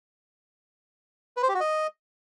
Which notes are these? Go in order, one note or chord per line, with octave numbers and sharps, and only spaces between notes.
B4
C5
G4
F#4
D#5